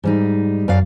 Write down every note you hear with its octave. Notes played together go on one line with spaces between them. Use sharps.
G#2 G3 D#4
F#2 D5 F5